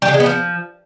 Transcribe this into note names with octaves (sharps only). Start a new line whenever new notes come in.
G3
D3
G#3
B3
F3